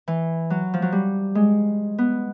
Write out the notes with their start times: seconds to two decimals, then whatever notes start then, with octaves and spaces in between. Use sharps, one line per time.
0.08 E3
0.50 F#3
0.74 F3
0.82 F#3
0.92 G3
1.35 G#3
1.98 B3